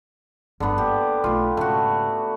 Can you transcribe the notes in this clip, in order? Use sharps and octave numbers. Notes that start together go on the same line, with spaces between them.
G1 G2 D3 B3
A#3 G4
B1 A3 F4
G#2 C#3 A3 F#4